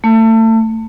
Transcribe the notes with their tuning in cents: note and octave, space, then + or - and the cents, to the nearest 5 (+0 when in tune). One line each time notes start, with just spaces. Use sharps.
A3 +30